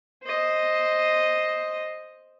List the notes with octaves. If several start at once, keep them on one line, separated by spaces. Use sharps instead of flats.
C5 D#5